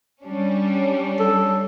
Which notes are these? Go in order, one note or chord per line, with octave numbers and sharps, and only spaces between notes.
G3 C#4 D4
A4